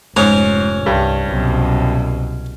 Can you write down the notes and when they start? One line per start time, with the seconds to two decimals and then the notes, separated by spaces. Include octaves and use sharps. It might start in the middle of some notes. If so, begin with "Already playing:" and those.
0.16 F1 G#2 C#4 C#5 A#5
0.86 C2 G2
1.29 C2 F#2 B2